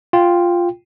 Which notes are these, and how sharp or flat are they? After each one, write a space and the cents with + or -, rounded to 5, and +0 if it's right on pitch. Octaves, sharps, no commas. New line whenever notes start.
F4 +0 G5 +5